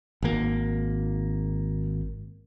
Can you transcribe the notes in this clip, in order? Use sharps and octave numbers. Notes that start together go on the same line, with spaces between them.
G#1 A#3